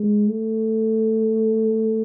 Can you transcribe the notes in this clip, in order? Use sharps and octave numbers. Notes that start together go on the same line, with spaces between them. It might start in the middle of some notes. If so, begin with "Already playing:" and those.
Already playing: G#3
A3